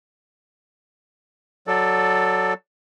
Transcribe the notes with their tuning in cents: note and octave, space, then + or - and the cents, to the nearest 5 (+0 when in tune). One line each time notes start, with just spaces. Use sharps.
F#3 +0 A4 +0 D5 +15